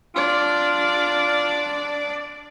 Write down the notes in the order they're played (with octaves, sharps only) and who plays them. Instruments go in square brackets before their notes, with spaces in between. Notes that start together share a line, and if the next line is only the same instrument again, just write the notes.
[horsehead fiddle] D4 D5 [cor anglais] F4